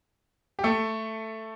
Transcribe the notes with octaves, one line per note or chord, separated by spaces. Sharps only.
G4
A3 A4